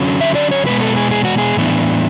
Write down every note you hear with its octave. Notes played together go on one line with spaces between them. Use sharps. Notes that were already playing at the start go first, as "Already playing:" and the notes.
Already playing: D3 F#3 C#4
E5
D5
C#5
B2 G#3 B3 B4
A4
G#4
G#4
F#4
G#4
A2 E3 B3 D4